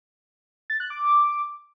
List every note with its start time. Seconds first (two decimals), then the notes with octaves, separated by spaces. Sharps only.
0.70 A6
0.80 F#6
0.90 D6